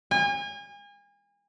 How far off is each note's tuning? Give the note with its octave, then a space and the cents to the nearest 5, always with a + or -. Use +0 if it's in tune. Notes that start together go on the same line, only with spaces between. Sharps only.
G#5 -35